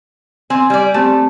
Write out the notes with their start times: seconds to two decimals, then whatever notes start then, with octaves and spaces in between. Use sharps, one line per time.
0.50 C4 G#5
0.70 G3 D5
0.94 A3 C4 G4 A5